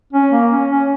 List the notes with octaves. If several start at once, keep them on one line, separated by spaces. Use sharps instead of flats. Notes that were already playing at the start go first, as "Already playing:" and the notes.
C#4
A#3
C#4
C#4